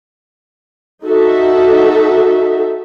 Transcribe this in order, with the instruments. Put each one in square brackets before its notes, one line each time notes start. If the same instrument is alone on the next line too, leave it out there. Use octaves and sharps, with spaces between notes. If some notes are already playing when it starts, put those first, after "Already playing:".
[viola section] D#4 F#4 A4 E5